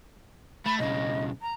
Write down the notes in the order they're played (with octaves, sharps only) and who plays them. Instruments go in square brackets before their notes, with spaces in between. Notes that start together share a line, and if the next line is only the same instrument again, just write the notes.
[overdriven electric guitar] A3 [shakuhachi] B5
[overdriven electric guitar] B1 C#3 [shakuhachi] D#5
[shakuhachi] A#5